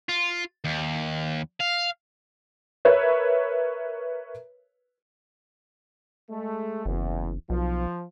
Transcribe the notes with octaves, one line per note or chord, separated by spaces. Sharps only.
F4
D#2
F5
A#4 B4 C#5 E5
G#3 A3
F#1 E2
B1 F3